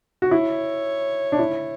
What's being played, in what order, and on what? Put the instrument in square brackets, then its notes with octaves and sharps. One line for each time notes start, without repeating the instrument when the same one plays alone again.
[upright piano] F#4
[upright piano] E4 [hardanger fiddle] C#5
[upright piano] D4
E4